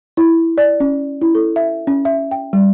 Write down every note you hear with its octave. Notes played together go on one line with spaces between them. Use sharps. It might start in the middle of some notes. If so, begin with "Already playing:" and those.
E4
D5
C#4
E4
A4
E5
C#4
E5
G5
G3